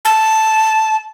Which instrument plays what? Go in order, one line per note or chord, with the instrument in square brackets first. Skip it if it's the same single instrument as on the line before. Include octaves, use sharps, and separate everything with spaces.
[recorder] A5